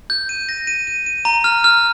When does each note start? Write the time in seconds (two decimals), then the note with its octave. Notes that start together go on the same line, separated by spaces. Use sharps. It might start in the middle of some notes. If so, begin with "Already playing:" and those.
0.10 G6
0.29 D#7
0.49 A#6
0.67 D#7
0.87 D#7
1.06 D#7
1.25 A#5
1.44 F6
1.64 F6